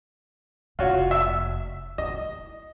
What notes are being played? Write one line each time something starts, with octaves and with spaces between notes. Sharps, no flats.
F1 F4 F#4 C#5
E5 E6
E4 D#5